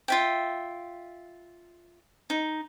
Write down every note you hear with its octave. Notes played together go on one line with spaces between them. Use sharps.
F4 E5 G5
D#4